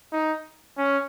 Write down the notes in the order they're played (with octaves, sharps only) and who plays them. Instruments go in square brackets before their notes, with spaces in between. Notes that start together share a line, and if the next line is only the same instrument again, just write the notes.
[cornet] D#4
C#4